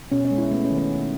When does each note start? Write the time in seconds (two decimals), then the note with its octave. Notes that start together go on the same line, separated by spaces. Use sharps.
0.12 B2 C#4
0.25 C#4
0.31 G#3
0.38 E4
0.51 A3 B3
0.64 C#4
0.71 D#3
0.78 C#4
0.91 D#3